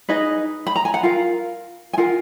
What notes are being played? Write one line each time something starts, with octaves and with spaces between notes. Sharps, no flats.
D#4 G#4 B4 D#5
B5
A#5
G#5
F#5
F4 A#4 F5
G#5
F4 A#4 F#5